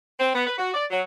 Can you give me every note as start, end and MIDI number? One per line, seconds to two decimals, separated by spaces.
0.19 0.33 60
0.34 0.44 59
0.47 0.54 71
0.58 0.73 66
0.74 0.85 74
0.91 1.00 54